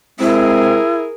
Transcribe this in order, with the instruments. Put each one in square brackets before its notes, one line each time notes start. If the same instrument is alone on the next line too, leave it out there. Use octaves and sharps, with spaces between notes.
[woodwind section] C3 G#3 C4 [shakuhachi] E4 [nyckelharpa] G#4 A#4